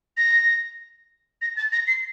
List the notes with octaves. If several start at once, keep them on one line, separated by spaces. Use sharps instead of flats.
A#6
A#6
A6
A#6
C7